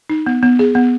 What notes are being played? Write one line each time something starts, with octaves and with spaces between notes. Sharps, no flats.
D#4
B3
B3
G#4
B3